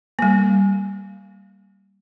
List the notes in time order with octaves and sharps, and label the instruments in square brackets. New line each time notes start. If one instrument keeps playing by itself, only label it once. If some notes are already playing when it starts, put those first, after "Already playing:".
[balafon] G3 A#3